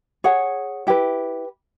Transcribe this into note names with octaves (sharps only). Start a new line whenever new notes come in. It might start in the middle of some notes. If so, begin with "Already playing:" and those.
G#4 C#5 F#5
E4 G4 B4